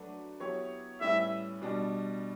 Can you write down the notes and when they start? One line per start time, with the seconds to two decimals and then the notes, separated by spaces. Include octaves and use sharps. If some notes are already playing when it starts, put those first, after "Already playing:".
Already playing: F#3 A3 D4 F#4 B4
0.40 F#3 B3 E4 G4 C#5
1.01 A2 G3 C#4 E4 B4 E5
1.61 B2 G3 D4